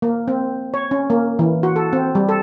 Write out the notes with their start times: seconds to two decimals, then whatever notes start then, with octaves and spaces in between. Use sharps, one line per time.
0.02 A#3
0.28 C4
0.74 C#5
0.91 C#4
1.10 A#3
1.39 E3
1.63 F#4
1.76 A4
1.93 C4
2.15 G3
2.29 A4